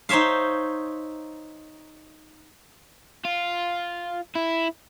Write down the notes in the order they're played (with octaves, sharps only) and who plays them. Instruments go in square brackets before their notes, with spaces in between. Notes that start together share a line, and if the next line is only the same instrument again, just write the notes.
[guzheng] D#4 C5 C#5 E5 F5
[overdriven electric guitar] F4
E4